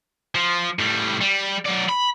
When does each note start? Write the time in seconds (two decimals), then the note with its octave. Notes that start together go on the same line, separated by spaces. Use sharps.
0.35 F3
0.79 A2 G3
1.21 G3
1.66 F#3 D5
1.89 B5